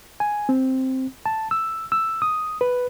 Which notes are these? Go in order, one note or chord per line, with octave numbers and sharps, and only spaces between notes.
G#5
C4
A5
E6
E6
D#6
B4